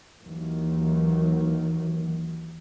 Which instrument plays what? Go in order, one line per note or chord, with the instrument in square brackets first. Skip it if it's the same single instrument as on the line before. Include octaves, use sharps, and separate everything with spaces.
[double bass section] D#2 D#3 E3 F#3